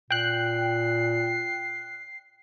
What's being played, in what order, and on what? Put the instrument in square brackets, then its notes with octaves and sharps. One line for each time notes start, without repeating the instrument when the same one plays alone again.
[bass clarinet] A#2 [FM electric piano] G5 F#6 [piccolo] C7